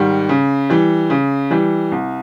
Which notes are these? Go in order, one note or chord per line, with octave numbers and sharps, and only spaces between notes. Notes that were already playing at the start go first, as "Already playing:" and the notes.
Already playing: G#2 D#3 G3
C#3
E3 G3
C#3
E3 G3
C2